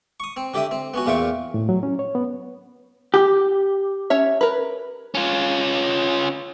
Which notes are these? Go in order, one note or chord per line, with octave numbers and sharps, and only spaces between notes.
C#6 D#6
C4
D3 G4 D5 E5 D#6
C4
B3 C#4 F#4
E2 A#2 F4 E5 G5 C#6
A2
F#3
C#4
C#5
B3
G4
C#4 C#5 E5
A#4 B4
C#4 F4